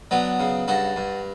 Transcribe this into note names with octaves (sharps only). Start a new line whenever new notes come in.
F#3 B3 D4
C#3
G2 F#4 A4
G2